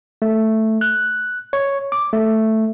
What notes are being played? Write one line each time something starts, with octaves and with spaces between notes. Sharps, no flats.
A3
F#6
C#5
D6
A3